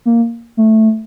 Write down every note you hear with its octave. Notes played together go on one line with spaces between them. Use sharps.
A#3
A3